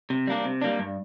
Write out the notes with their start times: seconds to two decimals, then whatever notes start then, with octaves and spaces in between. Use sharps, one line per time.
0.10 C3
0.27 G3 A#3 D4
0.45 C3
0.62 G3 A#3 D4
0.79 G2